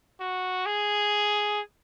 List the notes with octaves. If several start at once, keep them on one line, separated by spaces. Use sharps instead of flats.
F#4
G#4